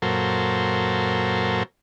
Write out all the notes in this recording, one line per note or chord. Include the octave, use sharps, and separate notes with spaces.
F#2 A#2 F#3 A4 A#4 C5